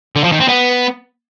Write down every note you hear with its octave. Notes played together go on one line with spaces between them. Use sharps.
D3
F3
D#3
C4
B3